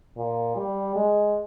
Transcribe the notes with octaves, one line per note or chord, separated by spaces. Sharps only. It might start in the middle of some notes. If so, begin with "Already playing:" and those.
A#2
G3
G#3